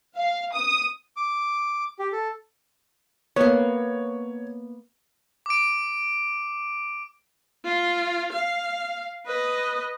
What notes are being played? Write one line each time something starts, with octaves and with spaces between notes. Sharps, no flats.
F5
D#6
D6
G4
A4
A#3 B3 C#5
D6 D7
F4
F5
B4 D#5